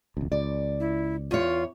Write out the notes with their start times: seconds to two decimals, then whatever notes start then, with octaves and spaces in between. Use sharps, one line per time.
0.17 E1 C#2
0.32 C#2 D5
0.80 E4
1.31 E2 F4 C#5